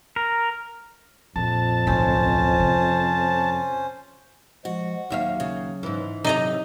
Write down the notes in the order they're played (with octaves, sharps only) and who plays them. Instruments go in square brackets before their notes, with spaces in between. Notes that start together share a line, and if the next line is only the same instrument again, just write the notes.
[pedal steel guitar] A#4
[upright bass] A#1 [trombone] F2 [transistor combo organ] A5
[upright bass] D1 B1 [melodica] C#4 C5
[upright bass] C3
[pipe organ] F3 G#3 [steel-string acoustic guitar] F#4
[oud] D#2 E5 F5 [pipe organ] F#3
[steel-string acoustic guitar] C#3
[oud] G#2 E3
[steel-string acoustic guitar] C3 [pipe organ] F#3 A4 [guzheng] D#4 D#5 A#5